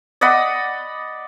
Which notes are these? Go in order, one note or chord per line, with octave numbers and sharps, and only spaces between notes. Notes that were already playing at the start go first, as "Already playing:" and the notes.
D5 D#5 F#5 B5